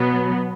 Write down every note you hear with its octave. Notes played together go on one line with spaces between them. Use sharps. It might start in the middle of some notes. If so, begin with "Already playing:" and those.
Already playing: B2 F#3 B3